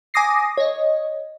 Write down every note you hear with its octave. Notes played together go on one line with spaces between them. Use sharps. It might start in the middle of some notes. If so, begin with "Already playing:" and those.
G#5 D6 D#6 A#6 C7
C#5 D#5